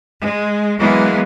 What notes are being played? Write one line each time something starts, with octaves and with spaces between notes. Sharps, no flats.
G#3
E3 F#3 G#3 A#3 B3